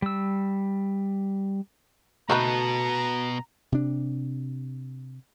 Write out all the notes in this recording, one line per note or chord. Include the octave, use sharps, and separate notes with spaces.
G3 E6
B2 A3 B3 D#4 F#4 B4 A5 A#5
C3 D4